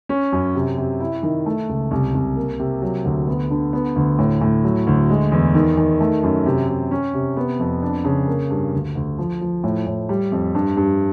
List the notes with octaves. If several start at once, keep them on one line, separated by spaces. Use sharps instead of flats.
C#4
F#2
C3
C3
E4
D#3
A3
C#2
C2
C2
A#3
C3
F#3
D2
B3
D3
B3
D2
A2
A2
F#3
D2
G#3
E2
D#3
D#3
A3
F#2
C3
C3
C#4
C3
B3
F2
D4
C#3
A#3
G2
D2
D2
F3
F3
A2
A2
G3
F2
G2
G2